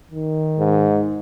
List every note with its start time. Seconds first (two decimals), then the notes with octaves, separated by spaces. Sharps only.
0.11 D#3
0.58 G#2